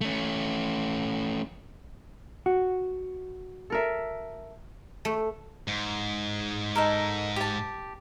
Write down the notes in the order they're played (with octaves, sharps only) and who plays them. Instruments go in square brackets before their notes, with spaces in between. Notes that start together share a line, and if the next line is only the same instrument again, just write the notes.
[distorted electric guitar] A3 C#4
[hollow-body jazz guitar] F#4
[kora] A4 A#4 E5
[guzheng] A3
[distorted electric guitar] G#2
[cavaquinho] D#4 A4 A#4
G4 A5